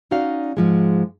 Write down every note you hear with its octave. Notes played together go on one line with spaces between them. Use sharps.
C#4 D#4 F#4 D5 F5
G#2 F3 G#3